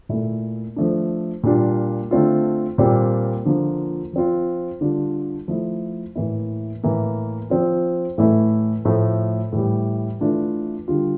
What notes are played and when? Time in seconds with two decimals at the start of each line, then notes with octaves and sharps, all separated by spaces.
0.09 A#2 A3 E4
0.76 F3 A3 D4
1.43 A#2 G3 D4 F4
2.11 D3 A3 C4 F4
2.78 A#2 G3 C4 F4
3.46 D3 F3 A#3 F4
4.13 F3 C4 F4
4.81 D3 G3 D4 F4
5.48 F3 A3 E4
6.15 A2 E3 A#3 E4
6.84 A2 E3 A#3
7.50 F3 C4 F4
8.18 A2 E3 A3 E4
8.85 A2 F3 A3
9.52 A2 E3 G3
10.21 E3 A3 D4 F4
10.88 D3 G3 D4 F4